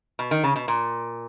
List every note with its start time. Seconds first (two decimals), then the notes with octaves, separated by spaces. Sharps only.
0.19 B2
0.31 D#3
0.44 C#3
0.56 B2
0.68 A#2